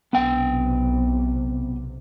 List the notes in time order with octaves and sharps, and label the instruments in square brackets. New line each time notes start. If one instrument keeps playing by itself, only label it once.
[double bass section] B1 C3 [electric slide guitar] B3 G5